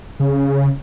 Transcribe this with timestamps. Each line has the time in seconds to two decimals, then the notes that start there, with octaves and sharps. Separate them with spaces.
0.20 C#3